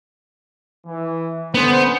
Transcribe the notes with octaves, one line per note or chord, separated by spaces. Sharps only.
E3
D3 B3 C#4 C5